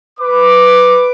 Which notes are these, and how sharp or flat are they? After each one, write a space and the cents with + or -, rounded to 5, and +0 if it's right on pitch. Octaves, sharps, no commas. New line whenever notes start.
B4 +5 D6 +5